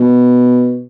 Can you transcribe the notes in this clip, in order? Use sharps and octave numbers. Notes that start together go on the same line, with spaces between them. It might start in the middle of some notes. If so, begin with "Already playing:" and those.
Already playing: B2